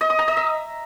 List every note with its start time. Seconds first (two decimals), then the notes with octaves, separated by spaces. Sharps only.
0.01 D#5
0.10 D#6
0.19 A#5
0.28 D#5
0.37 E5